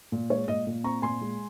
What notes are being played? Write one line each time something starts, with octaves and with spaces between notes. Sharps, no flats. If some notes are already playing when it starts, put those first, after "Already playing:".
A#2
G#3 C#5
A#2 D#5
A#2
C4 A#5 C#6
A#2 G#5 C6
G#3